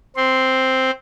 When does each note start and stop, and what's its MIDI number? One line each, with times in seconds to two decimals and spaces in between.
0.16 0.91 60
0.16 0.91 72